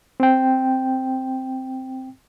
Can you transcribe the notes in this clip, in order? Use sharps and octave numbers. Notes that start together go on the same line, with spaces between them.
C4 G5